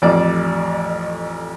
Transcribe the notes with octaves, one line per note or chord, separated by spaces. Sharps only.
A1 F2 D5